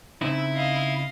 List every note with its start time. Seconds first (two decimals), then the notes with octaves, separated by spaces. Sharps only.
0.22 C#3 C4 D#4 E4
0.54 D#5 F5